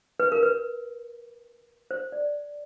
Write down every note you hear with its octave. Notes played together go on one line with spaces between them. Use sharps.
B4
A#4
B4
C5
D5